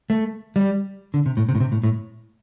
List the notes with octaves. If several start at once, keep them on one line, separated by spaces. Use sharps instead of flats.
A3
G3
D3
C3
A2
C3
A2
C3
A2
A2